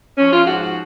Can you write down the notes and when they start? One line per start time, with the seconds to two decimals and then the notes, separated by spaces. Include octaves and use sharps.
0.18 F3 C#4
0.32 F4
0.46 G#2 F#4
0.60 F#4